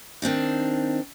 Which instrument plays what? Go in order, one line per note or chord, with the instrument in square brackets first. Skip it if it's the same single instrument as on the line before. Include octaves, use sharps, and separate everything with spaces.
[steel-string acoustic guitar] D#3 C4 D4 D#4